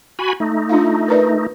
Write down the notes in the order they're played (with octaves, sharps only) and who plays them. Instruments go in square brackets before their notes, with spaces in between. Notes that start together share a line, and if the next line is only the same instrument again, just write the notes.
[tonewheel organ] F#4 G#5 B5
A3 D#4
[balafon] D4 F4 F5
A#4 B4 D5